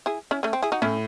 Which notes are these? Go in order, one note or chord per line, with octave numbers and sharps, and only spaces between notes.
E4 G#4
C#4 E4
A3 C#4
C4
E4 G#4
D#4 F#4
A2 C#4 E4